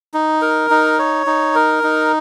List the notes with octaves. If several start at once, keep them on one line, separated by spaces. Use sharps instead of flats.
D#4
A#4
D#4
C#5
D#4
A#4
D#4